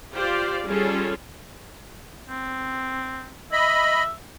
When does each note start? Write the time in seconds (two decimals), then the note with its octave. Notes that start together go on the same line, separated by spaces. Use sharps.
0.13 F4 G4 C5 D5 F5
0.66 G3 C#4 F4 G#4 A4
2.29 C4
3.52 D#5 E5 B5